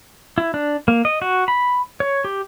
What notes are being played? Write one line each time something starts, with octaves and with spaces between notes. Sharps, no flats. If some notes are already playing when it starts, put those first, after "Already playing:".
E4
D4
A#3
D#5
F#4
B5
C#5
G4